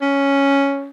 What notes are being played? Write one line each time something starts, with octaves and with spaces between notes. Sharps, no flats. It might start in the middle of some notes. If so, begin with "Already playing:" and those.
C#4